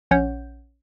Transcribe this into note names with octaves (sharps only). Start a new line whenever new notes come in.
A#1 C#4 C#5 F#5 G6